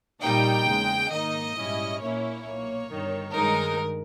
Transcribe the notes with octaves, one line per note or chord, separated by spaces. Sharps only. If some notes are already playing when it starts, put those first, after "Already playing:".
A#1 A#2 G3 A#3 D#4 G5
E2 C#3 G#3
G#2 D#3 A#3 D#4 D#5
A#1 G#2 G3 C#4 E4
A#1 A#2 A#3 C#4 E4 C#5
B1 A#2 A#3
G1 G2 D#3
G2 D#3 G#3 D#4 A#4